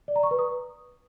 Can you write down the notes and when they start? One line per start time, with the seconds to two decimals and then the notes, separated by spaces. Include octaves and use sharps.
0.08 D5
0.16 A#5
0.23 C#6
0.31 B4
0.39 D#6